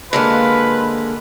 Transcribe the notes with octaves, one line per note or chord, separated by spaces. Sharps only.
D3 G#3 A#3 F4 B4